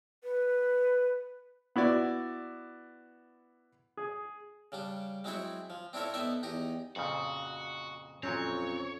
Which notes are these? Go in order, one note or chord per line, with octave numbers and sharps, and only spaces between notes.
B4
B3 E4 F#4 D5
G#4
C#3 G3 D4
F#3 G#3 C4 E4 C5 C#5
F3
C4 D4 E4 A4 A#4 C#5
B3 D#4 A4 C5 D5 E5
E2 D#4 G4 A#5
F2 A#2 C#3 F#4
F2 A#2 F#3 C4 C#4 C#5